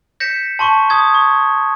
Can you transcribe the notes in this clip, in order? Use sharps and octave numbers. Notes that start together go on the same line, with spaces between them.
G6 A#6 B6 C#7 E7
A5 C6 C#6
D#6 G#6 G7
C#6